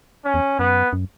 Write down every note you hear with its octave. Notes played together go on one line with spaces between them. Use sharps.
C#4
E2
F#2 B3
F#2